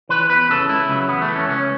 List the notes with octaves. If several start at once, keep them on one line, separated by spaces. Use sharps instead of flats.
E3 B4
E2 B4
C#3 E3 A4
C#2 E4
C#3 F#3
E2 B3
A3
E3
C#4
C#2 C#4